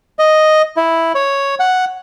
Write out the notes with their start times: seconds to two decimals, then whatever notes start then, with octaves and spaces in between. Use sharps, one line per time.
0.19 D#5
0.77 E4
1.15 C#5
1.60 F#5